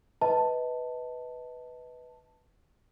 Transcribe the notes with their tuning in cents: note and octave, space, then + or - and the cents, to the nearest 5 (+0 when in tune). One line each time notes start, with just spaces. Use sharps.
B4 +0 D#5 +30 A5 +10